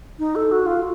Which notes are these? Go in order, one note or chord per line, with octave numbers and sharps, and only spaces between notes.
D#4
A4
F#4
F4